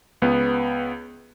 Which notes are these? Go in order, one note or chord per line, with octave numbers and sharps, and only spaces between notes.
C#2 B3